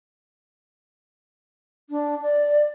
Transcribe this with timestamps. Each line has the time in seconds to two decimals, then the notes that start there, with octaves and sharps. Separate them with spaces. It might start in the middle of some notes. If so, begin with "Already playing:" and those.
1.90 D4
2.22 D5